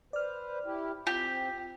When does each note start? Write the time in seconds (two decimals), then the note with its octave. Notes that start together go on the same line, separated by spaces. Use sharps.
0.13 B4 C5 D5 F6
0.65 E4 G4
1.07 C4 F4 G4